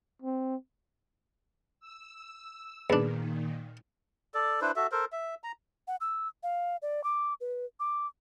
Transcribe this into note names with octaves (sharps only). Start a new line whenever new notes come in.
C4
E6
E2 A#2 D#3 D4
A4 D5
D4 E4 B4 C5
F#4 A4 E5
A4 A#4 C5
E5
A#5
F#5
E6
F5
D5
D6
B4
D6